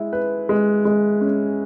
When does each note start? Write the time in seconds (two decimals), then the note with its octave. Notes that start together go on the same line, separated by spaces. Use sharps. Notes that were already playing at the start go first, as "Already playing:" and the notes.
Already playing: G#3 E4
0.13 B4
0.49 G#3
0.85 G#3
1.21 C#4